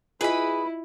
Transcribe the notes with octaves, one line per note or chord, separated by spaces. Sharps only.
E4 F4 G#4 B4 D#5 B5